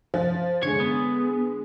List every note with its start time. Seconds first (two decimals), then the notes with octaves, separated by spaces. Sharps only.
0.14 F3
0.63 D3 G#3 C#5
0.80 B3